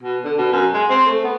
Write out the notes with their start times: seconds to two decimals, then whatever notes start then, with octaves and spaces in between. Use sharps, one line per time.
0.03 B2
0.24 D3
0.38 B2
0.52 F#2
0.74 G#3
0.90 C4
1.06 A3
1.24 B3